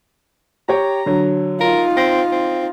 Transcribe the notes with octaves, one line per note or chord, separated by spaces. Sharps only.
G4 C#5 G5 A#5
D3 F#3
D#4 F4 A#4
C4 A#6
C4